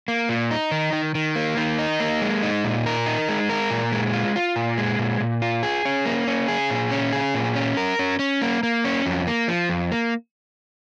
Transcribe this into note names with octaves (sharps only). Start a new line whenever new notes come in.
A#3
A#2
D#4
D#3
D#3
D#3
A#3
D#3
D#4
A#3
G#3
D#4
A#2
A#4
D#4
G#3
A#4
A#2
G#3
F4
F4
A#2
G#3
A#2
A#2
F4
G#4
C#4
A#3
C#4
G#4
A#2
C#4
G#4
A#2
C#4
A#4
C#4
C#4
A#3
A#3
C#4
F2
A#3
F3
F2
A#3